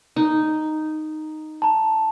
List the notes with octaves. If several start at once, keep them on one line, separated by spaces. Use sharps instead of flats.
D#4
A5 A#5